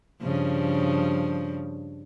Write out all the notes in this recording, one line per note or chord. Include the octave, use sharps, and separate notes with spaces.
G2 C#3 F3